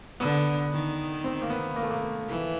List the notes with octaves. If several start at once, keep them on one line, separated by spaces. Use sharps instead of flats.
D3 B3
D#3
C4
A#3
B3
A#3
A3
A#3
E3